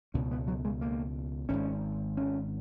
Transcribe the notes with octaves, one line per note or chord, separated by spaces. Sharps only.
C#2 B2 C#4
B3
F#3
G#3
A#3
G#1 G#2 C#4
C#4